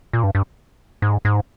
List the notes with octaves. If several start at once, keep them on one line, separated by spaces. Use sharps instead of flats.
A#2
G2
G2
G#2
G#2